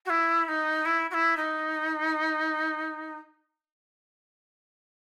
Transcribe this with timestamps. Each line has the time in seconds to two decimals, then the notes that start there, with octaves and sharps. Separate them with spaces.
0.05 F#4
0.09 E4
0.45 E4
0.48 D#4
0.85 E4
1.10 F#4
1.14 E4
1.37 D#4